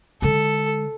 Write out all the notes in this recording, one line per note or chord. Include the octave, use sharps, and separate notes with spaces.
D3 G#3 A4